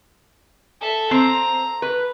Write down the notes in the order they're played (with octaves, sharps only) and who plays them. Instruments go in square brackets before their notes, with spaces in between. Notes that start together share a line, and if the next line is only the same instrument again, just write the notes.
[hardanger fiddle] A4 E5
[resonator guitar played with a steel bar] C4 C5 [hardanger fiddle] A#5
[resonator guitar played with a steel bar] B4